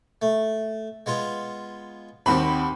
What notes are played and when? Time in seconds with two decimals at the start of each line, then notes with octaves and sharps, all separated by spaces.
0.22 A3
1.06 G#3 B3 F4
2.26 D#2 C4 F#4 G4 B5